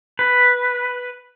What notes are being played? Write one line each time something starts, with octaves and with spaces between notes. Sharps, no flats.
B4